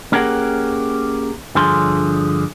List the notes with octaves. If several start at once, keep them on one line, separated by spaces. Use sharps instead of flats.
A#3 C#4 G4 G#4 A#4 F#5
G2 D3 F3 G#4 C6